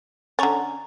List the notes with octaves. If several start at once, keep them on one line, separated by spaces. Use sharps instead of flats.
D3 C#4 A#5 C#6 A6